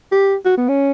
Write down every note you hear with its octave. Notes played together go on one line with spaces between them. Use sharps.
G4
F#4
B3
C#4